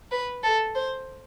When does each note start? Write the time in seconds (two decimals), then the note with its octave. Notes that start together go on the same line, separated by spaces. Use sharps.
0.11 B4
0.44 A4
0.75 C5